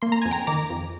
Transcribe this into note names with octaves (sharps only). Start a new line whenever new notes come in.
A#3 C6
A#5
F2 G#5
G5 A#5
D#3 A#5 D6
F2